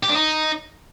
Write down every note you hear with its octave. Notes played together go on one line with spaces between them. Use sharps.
G4
D4
D#4